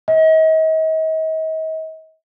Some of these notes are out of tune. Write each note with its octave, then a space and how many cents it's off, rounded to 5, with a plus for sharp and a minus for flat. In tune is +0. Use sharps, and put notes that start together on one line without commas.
D#5 +40